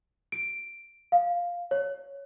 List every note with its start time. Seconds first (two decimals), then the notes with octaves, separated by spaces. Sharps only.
0.32 D7
1.12 F5
1.71 C#5